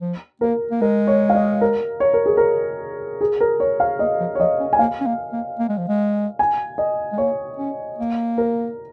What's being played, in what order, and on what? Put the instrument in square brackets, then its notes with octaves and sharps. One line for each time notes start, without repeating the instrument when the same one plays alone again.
[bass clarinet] F3
[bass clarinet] A#3 [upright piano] A#4
[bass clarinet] A#3
[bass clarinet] G#3 [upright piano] A#4
[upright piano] C#5
F5
D#5
A#4
C#5
A#4
G#4
A#4
G#4
A#4
C#5
F5
[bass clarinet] A#3 [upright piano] D#5
[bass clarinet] F3
[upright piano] C#5
[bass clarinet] F3 [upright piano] D#5
[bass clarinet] C#4
[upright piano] G#5
[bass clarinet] A#3 [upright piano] F5
[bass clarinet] C#4
A#3
A#3
A#3
G#3
F3
G#3
[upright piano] G#5
D#5
[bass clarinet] G#3
[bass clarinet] A#3 [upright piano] C#5
[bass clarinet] C#4
A#3
[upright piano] A#4